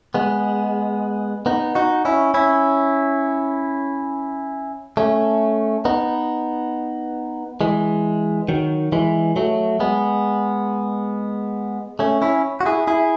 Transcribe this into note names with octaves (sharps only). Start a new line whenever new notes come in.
G#3 B3
B3 D#4
D#4 F#4
C#4 E4
C#4 E4
A3 C#4
B3 D#4
E3 G#3
D#3 F#3
E3 G#3
F#3 A3
G#3 B3
A3 C#4
C#4 E4
F#4
E4 G#4
E4 G#4